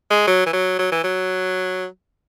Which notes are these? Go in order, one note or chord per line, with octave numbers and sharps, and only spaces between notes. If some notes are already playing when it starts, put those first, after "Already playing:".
G#3
F#3
E3
F#3
F#3
E3
F#3